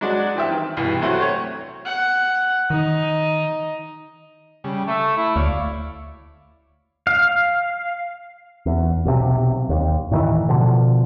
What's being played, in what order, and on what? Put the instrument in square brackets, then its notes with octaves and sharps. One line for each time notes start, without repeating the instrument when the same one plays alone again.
[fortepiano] F#3 G#3 D4 F#4
E3 C4 G4 E5
D#3
C2 G2 B2 E3
A2 C3 F#3 A3 C4 F#4
C#5
[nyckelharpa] F#5
[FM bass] D#3 [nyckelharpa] D#4 D#5
[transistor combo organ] C#3 G3
[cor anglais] A3 [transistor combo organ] E5
[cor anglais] E4
[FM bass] D2 [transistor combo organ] C#5 D5 F5
[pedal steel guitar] F5
[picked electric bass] E2
B1 C3
D#2
A2 D#3 E3
B2 D3 F3